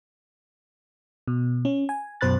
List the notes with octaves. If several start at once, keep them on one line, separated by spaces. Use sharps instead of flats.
B2
C#4
G#5
F#2 B2 C5 B5 F#6 A6